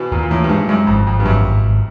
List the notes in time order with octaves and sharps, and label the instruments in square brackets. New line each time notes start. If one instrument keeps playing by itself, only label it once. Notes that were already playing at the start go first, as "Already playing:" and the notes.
Already playing: [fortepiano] B2 E3
[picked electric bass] D#2 [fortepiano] A#2
[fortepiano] A#2
[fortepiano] A2 [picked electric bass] E3
[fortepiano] G2
[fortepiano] G#2 [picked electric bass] G#3
[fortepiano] F#2 [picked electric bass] G#3
[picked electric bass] G#1 [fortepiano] F2
[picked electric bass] G#1 [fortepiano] F2
[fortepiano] G2
[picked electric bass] G#1 [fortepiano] F#2
[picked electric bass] G#1
G#1